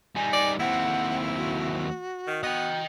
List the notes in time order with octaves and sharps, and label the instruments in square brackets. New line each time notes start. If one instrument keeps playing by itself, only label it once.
[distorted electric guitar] G3 D#4 [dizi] G#5
[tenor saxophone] D5
[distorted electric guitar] D#2 C4 [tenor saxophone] E4 [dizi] F#5
[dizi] F#4
[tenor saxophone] D#3
[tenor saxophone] B3 [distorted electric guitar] D#5 G5